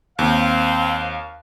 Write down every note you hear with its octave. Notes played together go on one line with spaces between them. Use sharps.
D#2 C4 F5